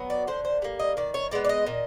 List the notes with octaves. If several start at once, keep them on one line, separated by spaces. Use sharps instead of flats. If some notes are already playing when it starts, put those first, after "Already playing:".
Already playing: F#3 B3
D5
D3 C5
C5
G3 A#3
D#5
D#3 D5
C#5
G#3 B3 D5
D5
D#5
A#2